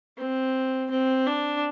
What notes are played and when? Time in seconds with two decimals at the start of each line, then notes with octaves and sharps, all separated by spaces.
0.18 C4
0.90 C4
1.27 D4